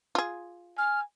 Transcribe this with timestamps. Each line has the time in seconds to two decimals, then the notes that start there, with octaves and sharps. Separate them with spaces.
0.15 F4 G#4
0.78 G#5 F6